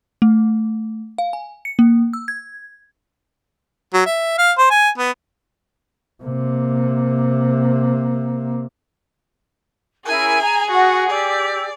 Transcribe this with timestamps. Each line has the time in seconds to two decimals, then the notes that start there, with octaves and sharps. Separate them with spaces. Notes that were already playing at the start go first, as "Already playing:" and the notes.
0.22 A3
1.18 F5
1.33 G#5
1.65 C#7
1.79 A#3
2.13 E6
2.28 G#6
3.94 F#3
4.06 E5
4.38 F5
4.58 C5
4.70 G#5
4.98 B3
6.23 C3 A#3
10.06 C#4 E4 G#4 A#4 G#5
10.41 A#5
10.71 F#4 F#5 D#6
11.10 G4 D5 E6